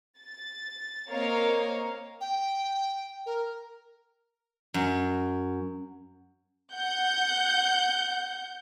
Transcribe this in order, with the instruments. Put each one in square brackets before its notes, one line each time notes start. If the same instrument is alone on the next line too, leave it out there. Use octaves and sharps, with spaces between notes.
[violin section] A6
A#3 C4 A#4 C#5 D#5 F5
[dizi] G5
A#4
[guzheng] F#2
[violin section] F#5 G6